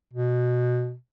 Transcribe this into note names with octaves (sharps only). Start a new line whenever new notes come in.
B2